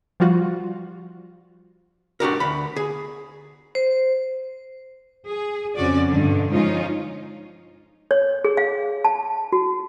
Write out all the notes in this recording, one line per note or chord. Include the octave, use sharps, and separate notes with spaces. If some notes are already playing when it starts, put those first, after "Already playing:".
F3 G3 F4 F#4
D4 F#4 G4 A#4
D2 B5
G#4
C5
G#4
F2 C#3 C#4 F#4 D5
G2 B2 D3
F3 G#3 C#4 D#4 F4
C#5
G#4
F5
A5
F#4